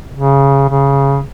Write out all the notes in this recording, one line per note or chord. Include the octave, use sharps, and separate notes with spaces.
C#3
C#3